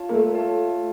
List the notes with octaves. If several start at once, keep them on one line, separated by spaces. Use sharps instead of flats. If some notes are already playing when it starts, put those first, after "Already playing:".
Already playing: F4 C#5 F5 A5
A#3
A3
F4 C#5 F5 A5